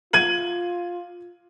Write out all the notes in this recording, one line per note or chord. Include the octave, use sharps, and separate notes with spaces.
F4 G#6 D#7 F#7